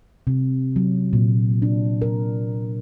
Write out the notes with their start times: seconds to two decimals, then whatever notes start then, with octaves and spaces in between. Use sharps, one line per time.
0.27 C3
0.76 F#3
1.13 A#2
1.62 D4
2.02 A#4